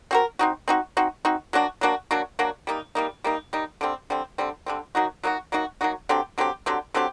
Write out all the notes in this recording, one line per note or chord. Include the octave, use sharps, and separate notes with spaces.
C4 F#4 A#4
C4 D#4 F#4
C4 D#4 F#4
C4 D#4 F#4
C4 D#4 F#4
F#3 A#3 D4 F#4
F#3 A#3 D4 F#4
F#3 A#3 D4 F#4
F#3 A#3 D4 F#4
G3 A#3 D#4
G3 A#3 D#4
G3 A#3 D#4
G3 A#3 D#4
D3 G3 C4
D3 G3 C4
D3 G3 C4
D3 G3 C4
F#3 A#3 D#4 F#4
F#3 A#3 D#4 F#4
F#3 A#3 D#4 F#4
F#3 A#3 D#4 F#4
D3 F#3 C4 G4
D3 F#3 C4 G4
D3 F#3 C4 G4
D3 F#3 C4 G4